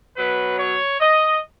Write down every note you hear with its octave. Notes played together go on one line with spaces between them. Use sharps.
B2 F#3 B4
C#5
D#5